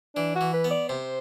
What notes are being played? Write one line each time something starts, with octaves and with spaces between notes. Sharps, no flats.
E3 D4
F#4
E3
B4
B3
D5
C3 C5